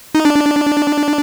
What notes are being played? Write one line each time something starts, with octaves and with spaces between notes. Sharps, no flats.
D#4
D4